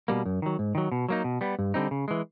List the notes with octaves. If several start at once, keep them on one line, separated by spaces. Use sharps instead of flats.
B2 G3 A#3
F#2
D#3 F#3
G#2
D#3 F#3
B2
F#3 A#3 D#4
B2
G3 B3
G2
D3 G3 C4 D#4
C#3
E3 G#3